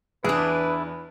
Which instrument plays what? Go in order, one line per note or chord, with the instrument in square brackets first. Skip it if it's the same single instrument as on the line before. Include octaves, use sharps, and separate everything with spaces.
[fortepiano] E2 F#6 [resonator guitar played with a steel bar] D4 G#4 [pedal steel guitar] E4 [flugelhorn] B4